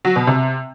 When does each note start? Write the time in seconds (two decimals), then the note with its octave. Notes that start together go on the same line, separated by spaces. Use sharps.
0.05 F#3
0.16 B2
0.27 C3